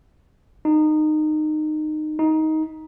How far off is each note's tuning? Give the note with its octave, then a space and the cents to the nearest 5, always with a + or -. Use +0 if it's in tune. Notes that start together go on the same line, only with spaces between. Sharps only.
D#4 -20
D#4 +15